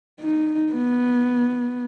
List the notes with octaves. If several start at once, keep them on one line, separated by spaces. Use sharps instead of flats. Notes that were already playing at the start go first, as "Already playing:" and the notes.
D#4
B3